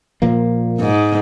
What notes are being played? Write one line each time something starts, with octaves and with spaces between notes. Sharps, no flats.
A#2 F3 A#3
G#2